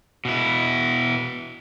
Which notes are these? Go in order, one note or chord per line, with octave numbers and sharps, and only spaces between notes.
B2 E4